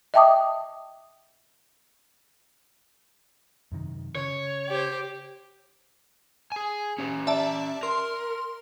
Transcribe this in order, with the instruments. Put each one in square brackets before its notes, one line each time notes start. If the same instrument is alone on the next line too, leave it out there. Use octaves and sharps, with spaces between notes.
[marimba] D#5 E5 G5 A5 D6 D#6
[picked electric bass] F#2 C3 D#3
[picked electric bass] C#3 [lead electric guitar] C#5
[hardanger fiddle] G4 C5
[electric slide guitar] G#4 G#5
C#4 G4
[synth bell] D5 E5 A5
[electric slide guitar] A#4 [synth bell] C6